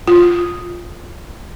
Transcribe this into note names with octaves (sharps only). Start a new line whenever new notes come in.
F4